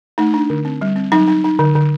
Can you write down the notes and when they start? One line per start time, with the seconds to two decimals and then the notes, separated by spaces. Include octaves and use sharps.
0.18 A3 D#4
0.34 D4
0.50 D3
0.65 C4
0.81 G3
0.96 C4
1.12 F#3 D#4
1.28 D#4
1.44 D#4
1.59 D3
1.75 D3